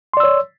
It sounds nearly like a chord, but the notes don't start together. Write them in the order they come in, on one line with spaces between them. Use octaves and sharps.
C6 D5 E6 C#5